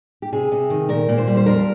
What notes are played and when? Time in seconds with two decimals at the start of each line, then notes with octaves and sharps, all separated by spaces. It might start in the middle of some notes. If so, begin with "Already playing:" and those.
0.22 G4
0.32 C3 G#4
0.51 C3
0.70 D#3
0.89 A#2 A#4
1.09 A#2
1.18 C5
1.27 G3
1.37 C5
1.46 F2 A#4